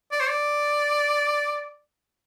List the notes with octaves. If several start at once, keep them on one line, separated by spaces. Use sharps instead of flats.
D5
C5
D5